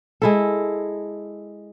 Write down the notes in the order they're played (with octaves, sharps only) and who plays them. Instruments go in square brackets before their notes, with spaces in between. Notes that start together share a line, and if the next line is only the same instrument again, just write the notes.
[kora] G#3 E4 A4